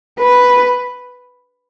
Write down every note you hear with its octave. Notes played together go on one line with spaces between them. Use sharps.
B4